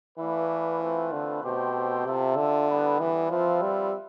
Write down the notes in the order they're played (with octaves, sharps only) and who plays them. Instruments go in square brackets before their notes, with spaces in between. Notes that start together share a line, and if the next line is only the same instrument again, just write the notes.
[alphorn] E3 [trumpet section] A3 E4 B4 D5 F5
[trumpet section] A3 C4 F4 B4
[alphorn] D3
[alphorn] B2 [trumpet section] A3 C4 G4 C5 G5
[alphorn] C3 [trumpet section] F4 A4 E5
[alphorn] D3
[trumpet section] G3 B3 E4 B4
[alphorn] E3
[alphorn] F3 [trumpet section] C4 F4 B4 E5
[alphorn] G3